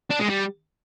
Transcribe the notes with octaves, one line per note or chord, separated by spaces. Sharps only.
D4
G#3
G3